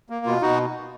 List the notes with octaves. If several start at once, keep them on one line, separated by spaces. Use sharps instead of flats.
A#3
B2 F4
B2 D#4 F#4